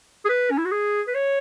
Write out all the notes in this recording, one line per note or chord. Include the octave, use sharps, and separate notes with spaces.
G#4
B4
C#4
E4
F#4
G#4
B4
C#5